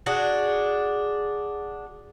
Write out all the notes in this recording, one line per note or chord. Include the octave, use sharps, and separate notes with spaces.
D4 F#4 G#4